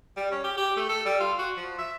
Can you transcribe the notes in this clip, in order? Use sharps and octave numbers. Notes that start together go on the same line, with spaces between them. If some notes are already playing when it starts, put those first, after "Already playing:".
G3
C#4
G4
G4
A3
A4
G3
F4
F#4
F3
E5